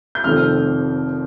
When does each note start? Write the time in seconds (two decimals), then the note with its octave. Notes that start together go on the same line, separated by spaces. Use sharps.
0.15 G6
0.24 F1 F2 D#3 A3 C4 F6